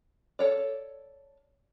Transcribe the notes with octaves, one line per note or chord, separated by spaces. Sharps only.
A4 C#5 D5